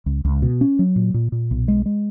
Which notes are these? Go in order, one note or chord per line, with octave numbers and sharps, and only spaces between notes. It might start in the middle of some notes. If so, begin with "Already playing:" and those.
C#2
C#2
B2
C#4
F#3
A#2
A#2
A#2
B1
G#3
G#3